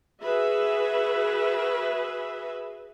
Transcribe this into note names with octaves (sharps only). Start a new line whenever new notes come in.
F#4 G#4 B4 E5